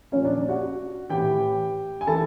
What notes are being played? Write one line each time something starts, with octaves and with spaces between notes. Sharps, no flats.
A#2 F3 C#4 C#5
D4 D5
F#4 F#5
A2 E3 G4 G5
G#5
E3 A4 A5